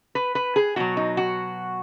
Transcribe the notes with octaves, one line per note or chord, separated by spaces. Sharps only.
B4
B4
G#4
B2 F#3 F#4
D#4
F#4